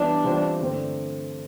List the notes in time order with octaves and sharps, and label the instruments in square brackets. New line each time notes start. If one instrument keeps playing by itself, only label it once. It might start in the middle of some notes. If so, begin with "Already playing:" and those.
Already playing: [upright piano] E3 G3 B3 [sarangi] D4
[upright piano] E3 G3 C4 F4
G2 D3 A3 C4